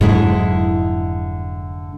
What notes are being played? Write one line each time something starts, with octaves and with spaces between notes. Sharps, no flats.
F1 G#2 D3 F#3 G#3 E4